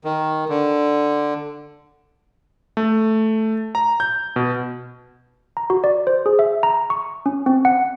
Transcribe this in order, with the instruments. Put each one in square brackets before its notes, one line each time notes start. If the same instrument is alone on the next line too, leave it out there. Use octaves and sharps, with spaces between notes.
[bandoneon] D#3
D3
[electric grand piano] A3
A#5
G6
B2
[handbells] A#5
F#4
D5
C5
G#4
E5
A#5
C#6
C#4
C4
F#5